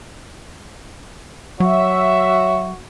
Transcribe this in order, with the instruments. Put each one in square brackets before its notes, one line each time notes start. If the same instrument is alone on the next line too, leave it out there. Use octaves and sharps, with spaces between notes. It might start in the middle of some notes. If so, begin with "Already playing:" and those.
[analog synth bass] F#3 [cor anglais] F#4 [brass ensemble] C#5 E5